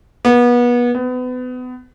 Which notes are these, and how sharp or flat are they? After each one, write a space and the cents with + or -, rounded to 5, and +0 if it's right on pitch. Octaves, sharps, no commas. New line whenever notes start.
B3 -30
B3 +30